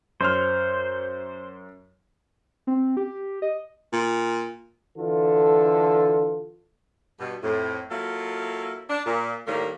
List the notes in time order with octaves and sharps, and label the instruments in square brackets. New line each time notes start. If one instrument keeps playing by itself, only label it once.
[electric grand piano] F#2 C#5 F6 [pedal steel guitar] C5
[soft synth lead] C4
G4
D#5
[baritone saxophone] A#2
[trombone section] D3 E3 F4 A4
[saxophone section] G2 B2
F2 A2
F#3 A#3 E4 F4 A4
D4
A#2
A2 D#3 G3 A#3